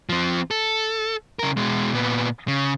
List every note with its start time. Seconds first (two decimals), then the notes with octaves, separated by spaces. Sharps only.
0.09 F3 C4
0.51 A4
1.39 C#3 A#4
1.57 B2 G#3
1.93 A#2 B3
2.48 C#3